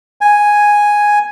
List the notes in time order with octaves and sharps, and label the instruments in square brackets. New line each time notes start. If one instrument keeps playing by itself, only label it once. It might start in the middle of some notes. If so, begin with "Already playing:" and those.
[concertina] G#5